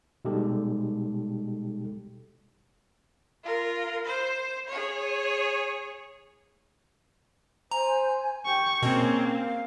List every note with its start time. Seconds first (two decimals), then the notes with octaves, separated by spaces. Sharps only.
0.25 B2 G3 G#3 D#4 G4 A4
3.44 F4 A#4
4.06 C5
4.68 G#4 C#5
7.71 C5 G#5 A#5
8.46 G4 G5 C#6
8.82 B2 A#3 C4 C#4 G#4
9.24 F5